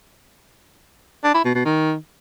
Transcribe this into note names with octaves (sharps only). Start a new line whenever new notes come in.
D4
E4
B2
B2
D#3